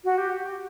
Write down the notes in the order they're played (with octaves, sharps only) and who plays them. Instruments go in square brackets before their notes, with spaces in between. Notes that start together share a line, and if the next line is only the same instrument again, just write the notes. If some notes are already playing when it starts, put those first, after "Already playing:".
[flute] F#4
G4